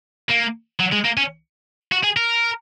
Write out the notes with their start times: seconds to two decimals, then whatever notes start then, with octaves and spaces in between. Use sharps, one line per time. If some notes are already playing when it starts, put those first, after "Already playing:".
0.30 A#3
0.80 F#3
0.93 G#3
1.05 A#3
1.17 C#4
1.92 F#4
2.04 G#4
2.17 A#4